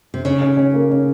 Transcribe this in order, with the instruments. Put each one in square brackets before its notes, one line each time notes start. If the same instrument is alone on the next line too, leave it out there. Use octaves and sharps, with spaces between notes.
[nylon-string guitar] C3
[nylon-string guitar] C#3 [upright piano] C#4
[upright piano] C#4
C#4
A#3
C#4